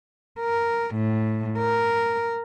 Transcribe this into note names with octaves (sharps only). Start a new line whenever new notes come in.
A#4
A2
A#4